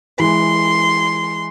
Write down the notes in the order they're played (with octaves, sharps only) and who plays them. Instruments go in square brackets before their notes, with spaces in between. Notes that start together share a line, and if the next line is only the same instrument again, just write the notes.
[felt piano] E3 G#3 [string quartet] C6